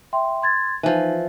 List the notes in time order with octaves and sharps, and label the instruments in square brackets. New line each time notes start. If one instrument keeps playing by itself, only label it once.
[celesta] E5 G5 C6
C6 G#6 A6
[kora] E3 F3 [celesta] D#4